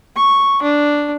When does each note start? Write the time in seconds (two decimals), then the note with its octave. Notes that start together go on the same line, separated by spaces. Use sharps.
0.16 C#6
0.62 D4